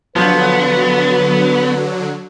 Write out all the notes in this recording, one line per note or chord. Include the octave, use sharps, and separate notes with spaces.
D3 F3 F#3 B3 B4